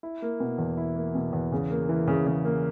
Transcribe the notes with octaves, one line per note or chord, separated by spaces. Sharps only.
E4
A#3
B2
E2
E4
A#3
B2
E2
C#3
A#3
E3
C#3
C#3
A#3